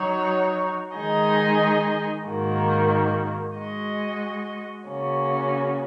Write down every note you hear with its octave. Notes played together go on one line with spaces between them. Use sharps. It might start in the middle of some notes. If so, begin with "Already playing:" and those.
Already playing: F#3 D#4 F#4 C#5
D#3 G#3 D#4 G#4 D#5
G#2 D#3 A#3 F#4
G#3 F#4 D#5
C#3 A#3 C#4 F#4